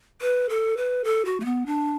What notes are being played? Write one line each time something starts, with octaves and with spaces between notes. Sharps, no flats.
B4
A4
B4
A4
F#4
A3
B3
D4